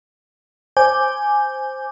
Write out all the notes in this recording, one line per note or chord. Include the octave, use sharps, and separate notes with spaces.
C5 G#5 D6 G6